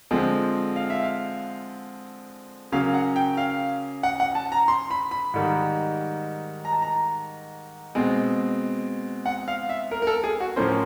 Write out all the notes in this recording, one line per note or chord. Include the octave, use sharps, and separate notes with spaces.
D3 F3 G#3 C4
F5
E5
F5
C#3 F#3 A#3 C#4 F5
F#5
G5
F5
F#5
F#5
A5
A#5
C6
B5
B5
G#2 D#3 G3
A#5
A5
A#5
B2 G#3 C4
F#5
F5
E5
A#4
A#4
A4
G#4
F#4
A2 F3 A#3 C#4 C5